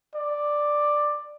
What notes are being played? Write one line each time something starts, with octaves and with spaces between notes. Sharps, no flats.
D5